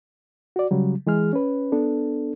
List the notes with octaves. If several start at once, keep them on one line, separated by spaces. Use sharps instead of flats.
F#4 D5
C#3 F#3 G3
E3 G#3 G#4 F6
C#4 B4
B3 D4 A4